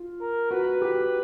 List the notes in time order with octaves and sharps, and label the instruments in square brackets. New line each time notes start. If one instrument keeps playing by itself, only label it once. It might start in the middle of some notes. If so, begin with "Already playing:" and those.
Already playing: [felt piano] F4
[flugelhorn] A#4
[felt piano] F#4 [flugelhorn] B4
[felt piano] G4